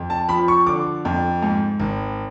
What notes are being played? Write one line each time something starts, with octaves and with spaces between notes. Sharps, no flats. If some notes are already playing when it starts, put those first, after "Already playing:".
Already playing: F2
A5
F3 B5
C#6
D3 D6
F2
G#2
G#1